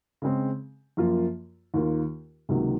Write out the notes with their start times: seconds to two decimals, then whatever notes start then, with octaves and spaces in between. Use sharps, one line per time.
0.22 C#3 G#3 C4
0.97 F#2 F3 A#3 F4
1.74 D#2 D#3 A#3 F4
2.49 C#2 C3 D#3 F#3 A#3